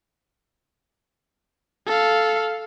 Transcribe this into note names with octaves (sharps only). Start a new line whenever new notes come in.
A4 F5